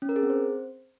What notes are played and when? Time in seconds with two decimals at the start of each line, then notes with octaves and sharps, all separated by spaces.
0.02 C#4
0.09 A#4
0.16 G#4
0.23 C4
0.30 C5